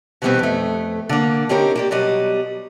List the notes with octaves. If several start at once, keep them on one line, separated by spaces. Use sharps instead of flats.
B2 D#3 E3 G3 B3 C4
F2 A3
D3 A#3
C4 C#4 D#4 G4 A#4
A#3 G4 D5
B2 F#3 G3 D#5